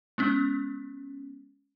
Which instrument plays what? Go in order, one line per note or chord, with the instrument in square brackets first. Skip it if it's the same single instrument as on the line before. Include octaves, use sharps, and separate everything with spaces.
[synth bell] G#3 B3 C#4